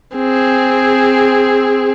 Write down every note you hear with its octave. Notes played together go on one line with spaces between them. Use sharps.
C4 G#4